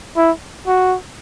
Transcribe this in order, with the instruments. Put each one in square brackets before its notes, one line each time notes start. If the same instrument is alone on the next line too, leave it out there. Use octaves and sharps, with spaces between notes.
[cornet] E4
F#4